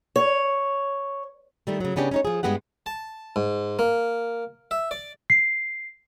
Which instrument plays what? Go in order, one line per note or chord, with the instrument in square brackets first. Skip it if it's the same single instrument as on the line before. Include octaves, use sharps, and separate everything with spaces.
[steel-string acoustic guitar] C#5
[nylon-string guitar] D#3 G3 A3
C#3 F#3
C#3 B3 C#4 D4 G4
C#4 D#4 C#5
F3 G#4
G2 G#3 B3 G4 F#5
[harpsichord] A5
G#2
A#3
E5
D5
[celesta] C7